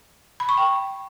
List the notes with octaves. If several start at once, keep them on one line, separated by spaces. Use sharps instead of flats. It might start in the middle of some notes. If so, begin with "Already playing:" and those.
B5
C#6
G5